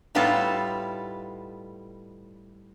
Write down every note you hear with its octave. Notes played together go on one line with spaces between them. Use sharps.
A2 G3 B3 D#4 F4 A4